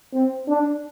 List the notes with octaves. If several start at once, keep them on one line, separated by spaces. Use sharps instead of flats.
C4
D4